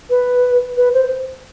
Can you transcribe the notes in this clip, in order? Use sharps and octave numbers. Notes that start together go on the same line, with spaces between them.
B4
B4
C5